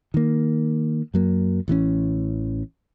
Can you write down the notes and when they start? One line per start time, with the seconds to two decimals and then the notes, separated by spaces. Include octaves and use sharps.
0.14 D#3 A#3
1.14 F#2 F#3 A#3
1.68 A1 E3 F#3 C#4